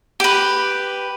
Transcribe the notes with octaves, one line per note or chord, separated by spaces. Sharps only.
G4 B4